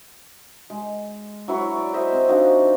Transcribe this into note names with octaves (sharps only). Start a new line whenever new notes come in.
G#3
F#3 E4 C#5 C#6
D5
C5 D#5 E5
C4
F3 D4 D#4 F#4